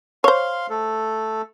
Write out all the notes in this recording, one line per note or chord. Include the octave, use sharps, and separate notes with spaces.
C5 C#5 F5 C6
A3 A4